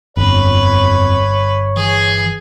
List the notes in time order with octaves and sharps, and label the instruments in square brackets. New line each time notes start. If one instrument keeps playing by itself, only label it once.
[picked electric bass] G1 [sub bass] F2 [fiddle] B4 [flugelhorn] C#5
[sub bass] E3 [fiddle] G#4